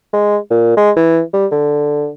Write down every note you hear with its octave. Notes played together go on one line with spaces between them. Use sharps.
G#3
A#2
G#3
E3
G3
D3